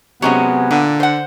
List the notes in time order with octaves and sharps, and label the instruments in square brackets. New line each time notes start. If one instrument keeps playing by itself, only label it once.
[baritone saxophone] C3 [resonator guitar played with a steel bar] F#3 G#3 C#4 [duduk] B3
[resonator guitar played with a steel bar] A#2 [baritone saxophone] D3
[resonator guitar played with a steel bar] C5 F#5